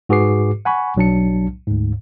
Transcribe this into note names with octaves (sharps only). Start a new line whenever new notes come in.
G#2 F#4 G#4 B4 D6 C7
F#5 G#5 B5 C#6
B1 F#3 D4 A5 C#7
D2 G#2